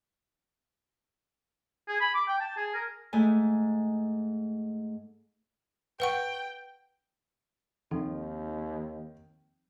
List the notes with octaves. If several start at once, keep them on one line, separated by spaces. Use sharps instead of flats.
G#4
B5
D6
G5
A5
G#4
A#4
G#2 A3 G#5
B4 F#5 G5 C#6
D#2 D#3 F3 C4 D#4